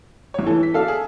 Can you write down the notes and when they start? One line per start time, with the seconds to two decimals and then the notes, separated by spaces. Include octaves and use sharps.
0.34 G1 C#5
0.46 E3 A4
0.63 B6
0.74 F#4 A4 D5 E5 F5
0.88 G#4